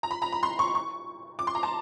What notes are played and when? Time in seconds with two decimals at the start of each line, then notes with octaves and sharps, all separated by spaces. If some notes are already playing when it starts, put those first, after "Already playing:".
0.03 A#5
0.11 B5
0.22 A#5
0.32 B5
0.43 C6
0.59 C#6
0.75 C#6
1.39 D6
1.47 C6
1.55 A#5
1.63 A5